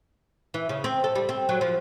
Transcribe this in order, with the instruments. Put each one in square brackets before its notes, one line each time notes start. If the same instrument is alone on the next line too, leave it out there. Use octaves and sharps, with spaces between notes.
[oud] E3
C#3
C4
A4
G3
C4
F#3
F3